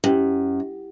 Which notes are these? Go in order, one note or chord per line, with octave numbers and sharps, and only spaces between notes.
F#2 E4 G4 G5